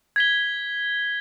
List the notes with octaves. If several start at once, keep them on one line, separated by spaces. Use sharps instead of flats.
G#6 B6 G7